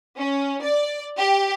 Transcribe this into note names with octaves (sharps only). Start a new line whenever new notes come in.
C#4
D5
G4